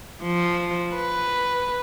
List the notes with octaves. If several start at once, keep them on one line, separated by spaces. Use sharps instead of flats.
F3
B4